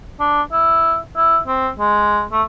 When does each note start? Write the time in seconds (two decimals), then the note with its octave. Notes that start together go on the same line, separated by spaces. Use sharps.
0.20 D4
0.52 E4
1.16 E4
1.47 C4
1.79 G#3
2.32 A3